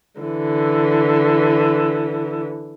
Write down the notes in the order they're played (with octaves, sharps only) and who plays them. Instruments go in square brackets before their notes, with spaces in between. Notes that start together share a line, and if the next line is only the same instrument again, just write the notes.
[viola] D3 E3